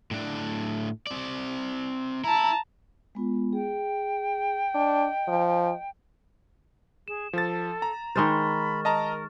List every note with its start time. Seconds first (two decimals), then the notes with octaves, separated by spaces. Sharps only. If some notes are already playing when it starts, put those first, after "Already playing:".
0.11 A2 D4
1.07 C4 D5
2.24 E4 A5 A#5
3.15 G#3 B3 F4
3.53 G#4 G5
4.75 D4 D#5
5.28 F3
7.08 G#4 E7
7.33 F3 A4 A6
7.82 A#5
8.16 D#3 G#3 C5 B5 C#6 F6 A6
8.85 A#4 D#5 A5 A#5